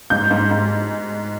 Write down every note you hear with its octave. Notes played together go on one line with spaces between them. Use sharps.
G#2 G6
G#2
G#2